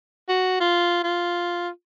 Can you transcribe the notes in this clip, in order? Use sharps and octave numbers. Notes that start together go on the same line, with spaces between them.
F#4
F4
F4